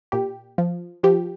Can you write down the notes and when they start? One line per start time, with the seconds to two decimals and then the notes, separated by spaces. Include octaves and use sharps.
0.12 A#2 G4
0.58 F3
1.03 F3 G4